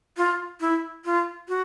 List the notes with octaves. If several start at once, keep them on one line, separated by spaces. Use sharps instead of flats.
F4
E4
F4
F#4